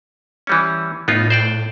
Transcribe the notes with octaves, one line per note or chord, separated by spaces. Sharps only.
E3 G3 C#4
A2 B3 D#4 F4
C5 D5 G5